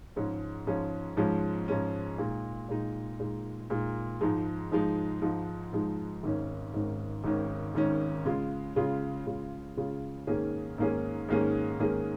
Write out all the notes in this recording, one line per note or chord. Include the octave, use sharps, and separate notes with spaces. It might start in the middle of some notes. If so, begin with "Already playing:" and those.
G#2 F3 G#3 C#4
G#2 F3 G#3 C#4
G#2 F3 G#3 C#4
G#2 F3 G#3 C#4
A#2 G#3 D#4
A#2 G#3 D#4
A#2 G#3 D#4
A#2 G#3 D#4
G#2 F3 G#3 D#4
G#2 F3 G#3 D#4
G#2 F3 G#3 D#4
G#2 F3 G#3 D#4
G#1 G#2 D#3 C#4
G#1 G#2 D#3 C#4
G#1 G#2 D#3 C#4
G#1 G#2 D#3 C#4
C#3 G#3 F4
C#3 G#3 F4
C#3 G#3 F4
C#3 G#3 F4
G#2 D#3 A#3 C#4 G#4
G#2 D#3 A#3 C#4 G#4
G#2 D#3 A#3 C#4 G#4
G#2 D#3 A#3 C#4 G#4